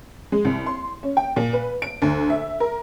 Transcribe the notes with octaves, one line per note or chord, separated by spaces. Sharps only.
G#3
C2
C6
C#4
G5
A#2
B4
D7
D2
E5
A#4